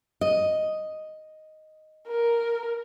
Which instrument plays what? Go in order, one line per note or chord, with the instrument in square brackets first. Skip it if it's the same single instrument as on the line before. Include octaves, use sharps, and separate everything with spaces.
[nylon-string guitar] D#5
[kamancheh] A#4